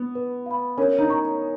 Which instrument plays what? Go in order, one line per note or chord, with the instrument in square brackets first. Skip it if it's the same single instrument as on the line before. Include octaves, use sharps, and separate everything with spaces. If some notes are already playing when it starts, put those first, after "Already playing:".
Already playing: [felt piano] B3
[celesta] B4
F5 B5
[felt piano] C#4 [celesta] A#4
[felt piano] D#4
[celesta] A#5 C#6